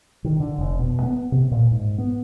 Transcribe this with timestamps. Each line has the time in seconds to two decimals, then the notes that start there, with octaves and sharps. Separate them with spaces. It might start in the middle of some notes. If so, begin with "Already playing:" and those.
0.24 D#3
0.40 D3
0.58 F1
0.79 B2
1.03 B3
1.32 C3
1.51 A#2
1.71 G#2
1.98 B3